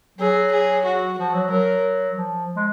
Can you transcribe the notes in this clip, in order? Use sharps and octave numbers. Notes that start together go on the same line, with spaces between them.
F#3 G#4
G#4
F#4
F3 F#4
F#3
F#3 A#4
F3
G#3